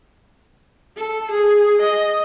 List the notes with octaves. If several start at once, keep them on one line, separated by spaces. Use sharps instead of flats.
A4
G#4
D#5